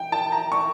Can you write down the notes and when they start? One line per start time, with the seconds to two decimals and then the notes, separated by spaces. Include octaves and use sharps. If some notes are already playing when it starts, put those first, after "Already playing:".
Already playing: G5
0.12 A5
0.32 A#5
0.52 C#6